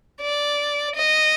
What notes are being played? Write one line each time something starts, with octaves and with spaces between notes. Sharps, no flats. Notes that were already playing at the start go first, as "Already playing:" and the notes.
D5
D#5